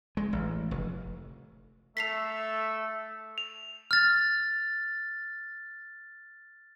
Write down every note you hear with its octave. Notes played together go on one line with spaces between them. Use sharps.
G#3
A1
F1
A3 A4 E5 B6 C7 F7
F7
F6 A6